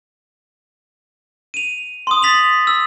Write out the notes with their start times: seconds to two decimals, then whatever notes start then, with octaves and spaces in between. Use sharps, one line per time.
1.54 D#7 F7
2.07 C6 D#6
2.22 A6 B6 F7 F#7
2.67 E6